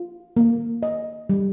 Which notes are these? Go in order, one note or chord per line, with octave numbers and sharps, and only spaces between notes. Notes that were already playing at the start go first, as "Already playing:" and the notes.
Already playing: F4
A#3
D#5
G3